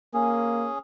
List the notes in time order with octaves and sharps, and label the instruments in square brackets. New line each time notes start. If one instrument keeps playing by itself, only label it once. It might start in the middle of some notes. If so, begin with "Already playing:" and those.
[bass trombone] A#3 [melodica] C#4 G#4